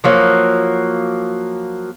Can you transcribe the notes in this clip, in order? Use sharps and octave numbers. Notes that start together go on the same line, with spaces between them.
F3 F#3 A#3